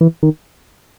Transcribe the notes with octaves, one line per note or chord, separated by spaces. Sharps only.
E3
D#3